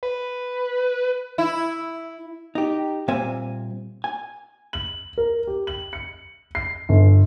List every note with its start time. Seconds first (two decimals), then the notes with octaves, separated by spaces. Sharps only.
0.03 B4
1.38 E4
2.55 D#4 G4
3.08 A#2 G3 C4 E5 G#5
4.04 G#5
4.73 F#7
5.18 A#4
5.47 G4
5.67 F#7
5.93 C#7
6.55 C7
6.89 G1